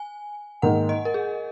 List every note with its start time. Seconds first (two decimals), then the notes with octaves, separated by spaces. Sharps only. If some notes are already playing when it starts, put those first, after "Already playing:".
Already playing: G#5
0.62 G#2 D#3 A#3 F#5
0.89 D#5
1.05 A#4
1.14 G#4